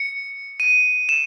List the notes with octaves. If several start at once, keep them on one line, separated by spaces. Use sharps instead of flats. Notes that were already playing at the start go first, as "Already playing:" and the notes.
Already playing: C#7
D#7
E7